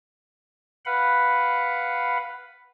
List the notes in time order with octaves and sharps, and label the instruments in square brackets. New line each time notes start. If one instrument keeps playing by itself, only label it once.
[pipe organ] B4 F5 F#5 B5